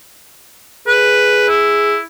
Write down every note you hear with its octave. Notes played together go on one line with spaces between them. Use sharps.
G#4 B4
E4